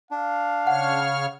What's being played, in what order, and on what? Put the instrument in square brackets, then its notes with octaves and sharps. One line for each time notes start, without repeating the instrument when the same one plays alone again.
[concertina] D4 [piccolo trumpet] F5
[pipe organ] C#3 C#5 F6 [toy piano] F#5